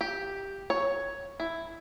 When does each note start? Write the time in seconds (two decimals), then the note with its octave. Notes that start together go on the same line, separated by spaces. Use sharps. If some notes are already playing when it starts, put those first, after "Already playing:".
0.01 G4
0.70 C#5
1.40 E4